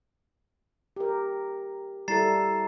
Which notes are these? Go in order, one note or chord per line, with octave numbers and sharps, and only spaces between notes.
G4 A#4
G3 E4 A4 A#5 A6 C7